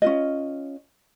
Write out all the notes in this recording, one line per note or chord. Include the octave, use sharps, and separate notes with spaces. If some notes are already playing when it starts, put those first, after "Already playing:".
C#4 F4 D#5